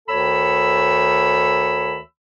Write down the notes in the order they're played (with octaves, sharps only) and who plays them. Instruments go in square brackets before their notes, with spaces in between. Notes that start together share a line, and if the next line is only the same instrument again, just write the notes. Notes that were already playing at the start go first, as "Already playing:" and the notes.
[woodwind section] D2 D#3 A4 C#5 B5 E6